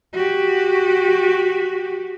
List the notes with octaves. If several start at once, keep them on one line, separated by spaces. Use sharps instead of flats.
F#4 G4